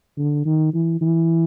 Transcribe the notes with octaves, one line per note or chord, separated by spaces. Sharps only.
D3
D#3
E3
E3